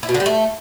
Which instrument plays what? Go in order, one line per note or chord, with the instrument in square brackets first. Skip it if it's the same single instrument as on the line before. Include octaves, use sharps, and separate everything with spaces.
[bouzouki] E4
B2
D3
G3
A3